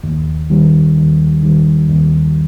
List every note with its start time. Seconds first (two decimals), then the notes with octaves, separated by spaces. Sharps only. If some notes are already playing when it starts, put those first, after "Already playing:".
0.04 D#2
0.50 D#3 G3
0.97 D#2
1.43 D#3 G3
1.89 D#2